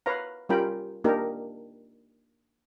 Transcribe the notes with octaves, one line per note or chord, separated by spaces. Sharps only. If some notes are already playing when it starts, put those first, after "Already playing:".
B4 C#5 F5 A#5
G3 C#4 F4 A#4 G5 B5
A#3 D4 D#4 G4 A#4